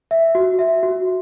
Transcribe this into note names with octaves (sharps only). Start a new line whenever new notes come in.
E5
F#4
E5
F#4